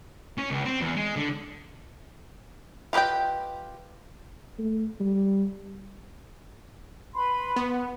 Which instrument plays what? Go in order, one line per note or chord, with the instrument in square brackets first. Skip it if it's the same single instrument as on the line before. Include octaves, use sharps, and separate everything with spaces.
[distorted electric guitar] C#4
C#2
C4
E2
G#3
D3
[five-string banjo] F4 G4 B4 D#5 G5
[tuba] A3
G3
[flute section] B4 B5 C6
[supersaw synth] B3